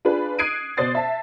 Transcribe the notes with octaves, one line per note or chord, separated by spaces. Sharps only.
D4 F4 G#4 B4
D#6 F#6 G#6 C7 D7 D#7
B2 C5 D5 D#6 A6 C7
E5 A5